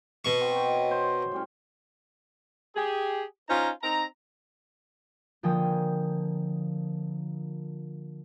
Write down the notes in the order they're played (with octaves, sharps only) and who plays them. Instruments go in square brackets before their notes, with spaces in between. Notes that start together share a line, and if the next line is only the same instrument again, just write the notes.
[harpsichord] B2 C#6
[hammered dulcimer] C4 F#4
D#4
C#5
C5
A2 G3 C#4
[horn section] G4 G#4
C#4 D#4 F4 C5 A#5
C4 D#4 A#5
[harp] D3 F3 A#3 G5 G#5 D#6